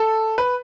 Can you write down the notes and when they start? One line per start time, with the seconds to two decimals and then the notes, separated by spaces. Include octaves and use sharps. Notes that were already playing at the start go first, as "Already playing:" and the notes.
Already playing: A4
0.38 B4